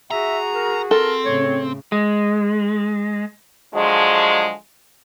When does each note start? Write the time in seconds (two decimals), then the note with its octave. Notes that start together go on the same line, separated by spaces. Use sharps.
0.11 F#4 G#4 E5 A#5
0.54 A#4
0.91 C4 A4 A#4
1.26 A2 C#3 C#5
1.92 G#3
3.74 D3 F3 F#3 G#3